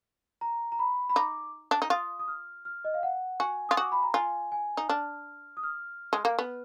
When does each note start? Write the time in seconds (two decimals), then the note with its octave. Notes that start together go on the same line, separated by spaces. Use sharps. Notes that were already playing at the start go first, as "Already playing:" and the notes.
0.41 A#5
0.72 A#5
0.79 B5
1.10 B5
1.16 D#4 D6
1.71 D4
1.82 D#4
1.90 F4 D#6
2.19 D#6
2.28 F6
2.65 F6
2.85 D#5
2.94 F5
3.03 F#5
3.40 F#4 G#5
3.69 F4 D#6
3.77 F#4 D6
3.92 B5
4.03 A#5
4.14 F4 G#5
4.52 G#5
4.77 D#4
4.89 D4 F6
5.57 D#6
5.63 F6
6.13 G#3
6.25 A#3
6.39 B3